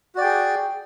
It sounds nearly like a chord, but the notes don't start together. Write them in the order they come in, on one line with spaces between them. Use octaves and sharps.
F#4 D5 G5 G#4